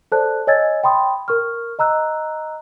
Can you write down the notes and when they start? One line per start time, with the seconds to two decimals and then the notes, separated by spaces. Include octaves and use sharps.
0.12 A4 C5 D5 A5 F#6
0.47 C#5 D#5 G#5 E6 G#6 A6
0.83 G5 B5 C6 D#6
1.28 A#4 C#6 F6
1.79 D#5 A#5 E6 F#6